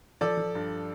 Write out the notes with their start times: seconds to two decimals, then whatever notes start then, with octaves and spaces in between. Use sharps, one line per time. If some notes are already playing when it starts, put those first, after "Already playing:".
0.21 F3 A4 D5
0.37 F3
0.55 G2